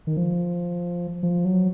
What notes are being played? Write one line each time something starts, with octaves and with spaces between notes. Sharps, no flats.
D#3
F3
F3
F#3